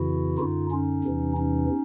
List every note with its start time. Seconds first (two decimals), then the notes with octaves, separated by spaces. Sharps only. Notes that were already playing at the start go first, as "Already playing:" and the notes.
Already playing: F2 C#3 E3 E4 F#4
0.38 F#2 D3 D#4 F4
0.71 C#4 D#4
1.04 E2 C3 E3
1.37 C#4 D#4